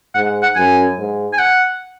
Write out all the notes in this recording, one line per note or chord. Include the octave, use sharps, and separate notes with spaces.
G#2 F#5
F#5
F#2 G#5
G#2
G#5
F#5